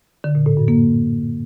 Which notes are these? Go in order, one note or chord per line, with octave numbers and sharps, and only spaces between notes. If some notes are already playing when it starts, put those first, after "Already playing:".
D3
A#2
A2
F#2
A#3